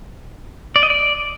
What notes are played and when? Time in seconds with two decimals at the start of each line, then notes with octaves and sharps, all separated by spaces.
0.76 D5
0.83 D#5
0.90 D5